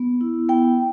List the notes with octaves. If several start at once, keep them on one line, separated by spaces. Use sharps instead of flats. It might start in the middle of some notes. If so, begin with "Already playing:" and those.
Already playing: B3
E4
B3 G5